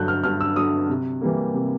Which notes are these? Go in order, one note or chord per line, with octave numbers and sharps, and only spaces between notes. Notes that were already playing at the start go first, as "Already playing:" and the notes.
Already playing: G2 D3 F#3 F#6 G6
F6
G2 F6
E6
D3 F#3 D#6
C3
E3 G3 A#3
C3